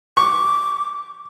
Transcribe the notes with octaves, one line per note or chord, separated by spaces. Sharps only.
C#6 D6